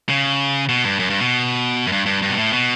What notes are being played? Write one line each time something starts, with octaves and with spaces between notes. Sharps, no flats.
C#3
B2
G2
F#2
G2
B2
F#2
G2
G2
G2
B2
A2
B2